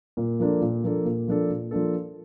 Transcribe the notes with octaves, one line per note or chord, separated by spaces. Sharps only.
A#2
F3 A#3 D4 A4
A#2
F3 A#3 D4 A4
A#2
F3 A#3 D4 A4
A#2
F3 A#3 D4 A4